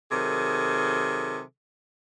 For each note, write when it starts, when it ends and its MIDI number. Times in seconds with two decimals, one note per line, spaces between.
0.11 1.41 48
0.11 1.41 51
0.11 1.41 54
0.11 1.41 68
0.11 1.41 69